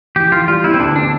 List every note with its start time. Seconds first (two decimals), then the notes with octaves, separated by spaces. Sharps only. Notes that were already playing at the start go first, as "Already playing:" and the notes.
0.16 E3 G4
0.32 E3 F4
0.48 G3 F4
0.64 B3 E4
0.74 C4
0.80 D2 D4
0.96 B3 D4